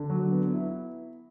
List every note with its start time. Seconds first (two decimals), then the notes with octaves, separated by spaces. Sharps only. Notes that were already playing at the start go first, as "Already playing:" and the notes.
Already playing: D3
0.10 F#3
0.32 B3
0.54 E4